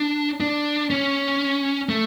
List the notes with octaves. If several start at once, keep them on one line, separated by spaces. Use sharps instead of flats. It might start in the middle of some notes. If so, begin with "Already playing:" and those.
Already playing: D4
D4
C#4
A3